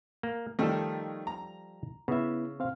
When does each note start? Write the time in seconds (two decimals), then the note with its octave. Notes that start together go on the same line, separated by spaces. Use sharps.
0.23 A#3
0.59 D#3 F3 G3 A3 A4
1.27 A#5
2.08 C#3 B3 E4 E5
2.60 C4 F5